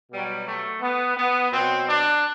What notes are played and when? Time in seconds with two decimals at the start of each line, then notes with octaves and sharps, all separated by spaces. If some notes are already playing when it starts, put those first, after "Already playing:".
0.12 B2 F#3 G3
0.46 A3
0.82 B3
1.17 B3
1.53 B2 F#3 C4
1.87 D4